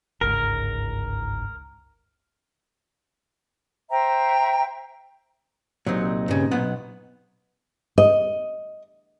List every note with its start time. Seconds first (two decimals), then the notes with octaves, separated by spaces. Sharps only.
0.21 G1 C#2 G#2 A#4
3.90 C5 E5 G5 A#5
5.86 C2 A#2 F#3 C4 D#4
6.28 G2 C#3
6.51 B1 B3 F#5
7.98 D#5